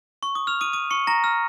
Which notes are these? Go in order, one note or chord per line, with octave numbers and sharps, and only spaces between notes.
C#6
D#6
F6 F7
D#6 D#7
D#6 D#7
C#6 C#7
A#5 A#6
F6